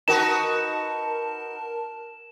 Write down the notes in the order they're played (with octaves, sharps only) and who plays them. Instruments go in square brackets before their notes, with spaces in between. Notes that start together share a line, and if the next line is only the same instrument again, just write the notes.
[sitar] D#4 F#4 B4 [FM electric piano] A#4 A5 [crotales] E7